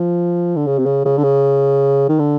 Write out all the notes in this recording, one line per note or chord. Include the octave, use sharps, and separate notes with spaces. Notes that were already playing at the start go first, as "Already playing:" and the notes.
Already playing: F3
D3
C#3
C3
C#3
C#3
D3
C#3
D#3
D3